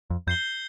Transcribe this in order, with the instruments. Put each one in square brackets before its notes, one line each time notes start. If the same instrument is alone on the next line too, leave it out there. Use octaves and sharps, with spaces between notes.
[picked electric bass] F2
[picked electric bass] F2 [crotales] G6 C7 G7